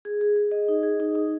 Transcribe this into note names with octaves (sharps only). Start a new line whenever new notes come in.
G#4
G#4
G#4
D#5
D#4
G#4
D#4
D#4